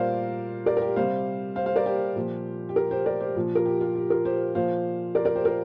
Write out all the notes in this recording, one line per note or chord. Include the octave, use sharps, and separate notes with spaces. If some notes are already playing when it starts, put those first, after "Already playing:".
Already playing: A#2 G3 A#4 C5 D5 F5
A#4 D5
A#4
G4
C3 G3 C5 F5
C5 F5
C5 F5
A#4 D5
G4 C5
A#2 F3
G4
F4 A#4
G4 C5
A#4 D5
G4 C5
A#2 F3
F4 A#4
G4
F4
G4
F4 A#4
G4 C5
A#2 F3 C5 F5
A#4 D5
A#4 D5
G4 C5
F4 A#4